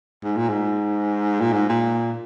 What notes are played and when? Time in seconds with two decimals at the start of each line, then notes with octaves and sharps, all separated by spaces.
0.23 G#2
0.37 A#2
0.49 G#2
1.40 A#2
1.53 G#2
1.69 A#2